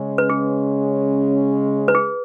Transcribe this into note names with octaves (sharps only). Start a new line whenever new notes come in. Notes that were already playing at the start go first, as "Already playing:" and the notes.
Already playing: C#3 G#3 C#4
B4
G#4
B4
G#4